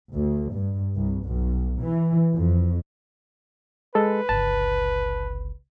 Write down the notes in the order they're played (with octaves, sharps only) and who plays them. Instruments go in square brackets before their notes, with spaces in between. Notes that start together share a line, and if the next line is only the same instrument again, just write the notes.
[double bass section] D2
G2
C2
B1
E3
F2
[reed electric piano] G#3 A4 [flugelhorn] B4
[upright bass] G1 C#2 [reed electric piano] A5